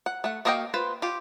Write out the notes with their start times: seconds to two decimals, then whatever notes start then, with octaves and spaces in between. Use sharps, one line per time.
0.06 F#5
0.24 A3 F#5
0.45 A#3 F#4 D#5 F5 G5
0.74 F4 B4 C5
1.02 F4 G4